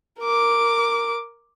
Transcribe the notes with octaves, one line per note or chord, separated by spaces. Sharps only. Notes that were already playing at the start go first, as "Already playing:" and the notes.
A#4 D6